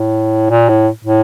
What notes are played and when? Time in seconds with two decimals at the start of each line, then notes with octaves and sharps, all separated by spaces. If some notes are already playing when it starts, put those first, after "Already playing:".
Already playing: A2
0.50 A#2
0.69 A2
1.04 A2